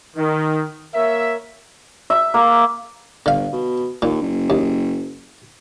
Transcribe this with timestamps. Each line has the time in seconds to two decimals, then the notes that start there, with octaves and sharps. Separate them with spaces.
0.16 D#3
0.94 A#3 A#4 C#5 E5
2.10 E5
2.34 A#3
3.26 G1 D3 F5
3.53 B2
4.02 D#2 A#2
4.21 F#1
4.50 D#2